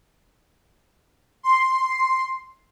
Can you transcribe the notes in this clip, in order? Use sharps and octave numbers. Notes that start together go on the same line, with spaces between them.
C6